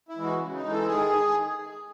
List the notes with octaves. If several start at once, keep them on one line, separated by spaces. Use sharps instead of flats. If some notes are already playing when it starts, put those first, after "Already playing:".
E4
E3 G#3
F#4
C#3
D#4
E3 G#3
A4
D#3 G#4